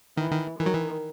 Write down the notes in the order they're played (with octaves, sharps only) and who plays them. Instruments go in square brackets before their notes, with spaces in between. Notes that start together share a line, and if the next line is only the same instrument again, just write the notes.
[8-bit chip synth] D#3 [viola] E3
[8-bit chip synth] D#3
[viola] D#3 [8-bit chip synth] E3
[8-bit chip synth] F#3
E3